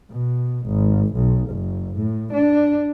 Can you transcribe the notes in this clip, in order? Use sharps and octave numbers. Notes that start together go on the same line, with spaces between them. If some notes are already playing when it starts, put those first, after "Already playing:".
B2
G#1
B1
F#1
A2
D4